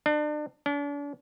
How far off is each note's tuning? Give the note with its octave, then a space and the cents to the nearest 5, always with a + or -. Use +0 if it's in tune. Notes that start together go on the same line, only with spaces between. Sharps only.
D4 +35
D4 -40